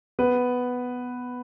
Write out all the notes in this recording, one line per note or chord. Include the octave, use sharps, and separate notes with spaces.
B3 B4